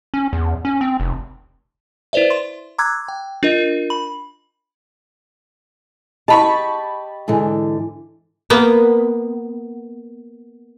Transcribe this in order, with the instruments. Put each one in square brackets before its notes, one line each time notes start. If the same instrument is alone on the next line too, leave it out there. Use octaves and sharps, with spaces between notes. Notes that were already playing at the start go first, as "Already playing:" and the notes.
[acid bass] C#4
E2
C#4
C4
F1
[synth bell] E4 B4 C5 D5 E5
C6
A#5 C6 D6 E6 F#6 G#6
G5
D4 F4 A#4 D#5
B5 F#7
[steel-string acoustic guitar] G4 D#5 [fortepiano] A5 B5 C#6
[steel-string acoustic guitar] G#2 D3 E3
[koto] A#3 B3